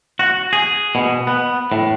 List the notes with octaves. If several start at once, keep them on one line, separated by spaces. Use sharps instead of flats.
F#4
G#4
B2
B3
A2